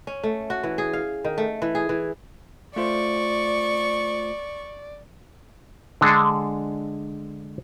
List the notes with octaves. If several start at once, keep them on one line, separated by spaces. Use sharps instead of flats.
C#4
A3
F#4
E3
G#4
F5
D#3
A3
E3
G#4
E3
A3 F4 C5 D5 C#6
D3 G#3 D4 G#4 A4